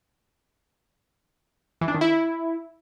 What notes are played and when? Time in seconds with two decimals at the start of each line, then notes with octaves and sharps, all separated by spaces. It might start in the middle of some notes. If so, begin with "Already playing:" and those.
1.81 E3
1.88 D4
1.95 D#3
2.01 E4